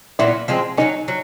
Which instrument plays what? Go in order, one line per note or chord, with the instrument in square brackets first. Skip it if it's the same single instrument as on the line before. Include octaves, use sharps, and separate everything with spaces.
[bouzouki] A#2 F#3 B3 [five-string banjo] E4
[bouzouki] F3 G#3 C4
[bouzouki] F#3 A3 C#4 [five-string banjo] D#4
[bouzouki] F#3